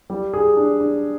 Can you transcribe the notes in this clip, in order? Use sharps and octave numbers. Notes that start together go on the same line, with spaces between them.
G3
G#4
D4
D4